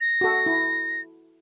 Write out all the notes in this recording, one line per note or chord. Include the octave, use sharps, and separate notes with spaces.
A#6
F#4 A4
E4